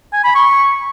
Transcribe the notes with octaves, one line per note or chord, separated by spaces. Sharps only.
G#5
B5
C#6